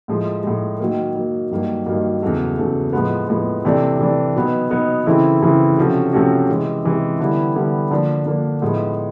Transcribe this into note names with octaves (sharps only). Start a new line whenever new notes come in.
A2 F3 G#3
A2 F3 G#3
D#3 F#3 A#3
D#3 F#3 A#3
G2 D#3 F#3 A#3
G2 D#3 F#3 A#3
E2 C#3 F#3 A3
E2 C#3 F#3 A3
A2 F3 G#3 B3
A2 F3 G#3 B3
C3 E3 A3 D4
C3 E3 A3 D4
B2 F#3 B3 D#4
B2 F#3 B3 D#4
C#3 E3 A3 C4 E4
C#3 E3 A3 C4 E4
C3 F3 A3 C#4 F#4
C3 F3 A3 C#4 F#4
C3 E3 G#3
C3 E3 G#3
D3 G3 B3 E4
D3 G3 B3 E4
D3 F3 A#3 D4
D3 F3 A#3 D4
A2 F3 G#3 B3 D#4